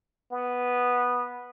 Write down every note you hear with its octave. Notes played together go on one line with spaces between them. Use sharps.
B3